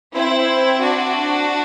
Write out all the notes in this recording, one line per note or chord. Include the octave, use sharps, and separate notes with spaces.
C4 E4
D4 F#4